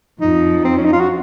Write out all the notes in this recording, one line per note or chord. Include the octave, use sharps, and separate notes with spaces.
F2 F3 D#4
C4
C#4
D#4
F4
F#4